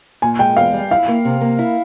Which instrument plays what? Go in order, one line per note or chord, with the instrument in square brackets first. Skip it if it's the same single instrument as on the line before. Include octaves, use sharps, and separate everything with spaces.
[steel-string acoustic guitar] A#2 [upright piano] G#5
[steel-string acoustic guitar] G#3 [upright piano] G5
[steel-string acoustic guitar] E2 [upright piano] F5
[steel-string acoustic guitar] G3
[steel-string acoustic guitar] E4 [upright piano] F5
[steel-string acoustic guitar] A#3
C3
A#3
E4